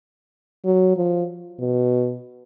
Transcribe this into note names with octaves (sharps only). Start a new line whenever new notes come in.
F#3
F3
B2